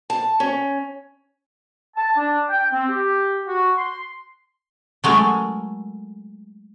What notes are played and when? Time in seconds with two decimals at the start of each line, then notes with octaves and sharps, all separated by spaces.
0.10 A5
0.40 C#4
1.95 A5
2.17 D4
2.48 G5
2.72 C4
2.88 G4
3.47 F#4
3.77 C6
5.04 F#3 G#3 A3 A#4